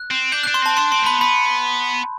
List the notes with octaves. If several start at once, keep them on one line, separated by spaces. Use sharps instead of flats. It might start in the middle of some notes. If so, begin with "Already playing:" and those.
Already playing: F#6
C4
D4 G6
D4 F#6
C6
C4 A5
D4 C6
C4 C6
A3
B3 B5
B3 B5